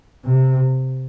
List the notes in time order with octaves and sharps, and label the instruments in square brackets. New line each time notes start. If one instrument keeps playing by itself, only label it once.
[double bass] C3